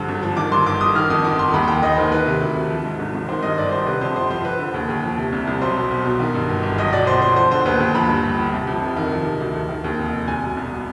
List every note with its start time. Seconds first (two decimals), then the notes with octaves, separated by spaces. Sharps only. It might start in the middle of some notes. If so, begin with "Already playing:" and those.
Already playing: G2 D3 F3
0.08 G#1
0.23 F3
0.37 D#3 D6
0.52 G2 C6
0.66 G1 D6
0.81 G1 D#6
0.95 D#3 F6
1.10 F2 D#6
1.24 G1 D6
1.39 G1 C6
1.53 D#2 B5
1.68 D#3 G5
1.83 D#2 D#5
1.97 D#3 C5
2.11 D#3 B4
2.26 C3
2.41 D2
2.55 D2
2.70 F3
2.85 G#2
2.99 G#1
3.14 G#1
3.29 D#3 C5
3.42 G2 D#5
3.58 G1 D5
3.72 G1 C5
3.86 C3 B4
4.01 F2 C5
4.16 G1 C5
4.30 F3 C5
4.45 F3 B4
4.59 D3
4.74 D#2
4.89 D#2
5.03 F3
5.18 C3
5.32 C2
5.47 C2
5.61 B1 C5
5.76 B2
5.91 B1
6.05 B2
6.20 D#3
6.34 G2
6.49 G1
6.63 G1
6.78 B1 D#5
6.93 B2 D5
7.07 B1 C5
7.21 B2 C5
7.36 F3 C5
7.51 D3 C5
7.65 D#2 B4
7.80 D#2
7.95 F3 B5
8.09 G2
8.24 G1
8.39 G1
8.53 C3
8.67 F2
8.82 F1
8.96 D#3
9.11 F3
9.26 C3
9.40 D2
9.55 D2
9.69 D#3
9.84 D#2
9.99 F1
10.13 F1
10.28 C2 G#5
10.43 B2
10.57 C2
10.71 B2